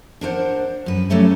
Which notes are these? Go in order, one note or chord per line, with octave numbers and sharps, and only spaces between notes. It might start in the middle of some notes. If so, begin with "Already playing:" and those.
D4 A#4 C5 F#5
F#2 B4
F#3 G3 A3 C#4 A4 E5